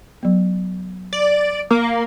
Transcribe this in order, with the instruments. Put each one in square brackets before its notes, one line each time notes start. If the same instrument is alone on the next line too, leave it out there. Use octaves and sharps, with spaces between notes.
[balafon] F#3 B3
[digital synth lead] D5
A#3